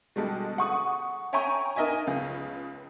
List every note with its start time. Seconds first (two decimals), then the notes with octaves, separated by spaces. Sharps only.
0.16 B2 D3 G3 G#3 A4
0.58 F#5 C#6 D#6
1.33 C#5 E5 G5 G#5 A#5 C#6
1.76 D4 D#4 A#4 D#5 E5 G#5
2.07 C#2 C#3 B3 F4